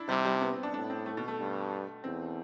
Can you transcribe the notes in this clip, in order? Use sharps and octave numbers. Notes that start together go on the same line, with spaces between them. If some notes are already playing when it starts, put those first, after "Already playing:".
Already playing: D4 E4
C3 G3
G3
B3
C4
D4
A2 D4
C4
A3
B2
A3
G2
E2 C4